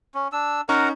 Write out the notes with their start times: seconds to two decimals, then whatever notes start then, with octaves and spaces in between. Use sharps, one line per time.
0.15 C#4
0.33 D4 E6
0.69 C#4 D#4 A#4 F#5 A#5 C#6